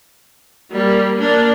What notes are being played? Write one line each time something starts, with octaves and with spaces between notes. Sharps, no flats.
G3 A#3
A#3 D4